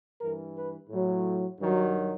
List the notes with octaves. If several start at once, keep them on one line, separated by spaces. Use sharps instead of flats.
G2 E3 A#4
B4
A2 F#3
G2 D#3 F#3